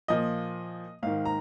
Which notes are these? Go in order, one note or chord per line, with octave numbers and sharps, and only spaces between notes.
A#2 F3 D#5
G#2 D#3 F5
A#5